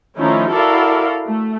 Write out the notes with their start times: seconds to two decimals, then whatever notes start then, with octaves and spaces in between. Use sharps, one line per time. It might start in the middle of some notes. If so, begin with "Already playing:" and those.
0.17 D#3 F3 A3 C#4 D#4 E4
0.50 E4 F#4 A4 A#4 D5 F5
1.26 A3